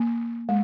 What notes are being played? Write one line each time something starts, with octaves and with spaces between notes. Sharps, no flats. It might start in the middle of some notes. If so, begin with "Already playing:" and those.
Already playing: A#3
G#3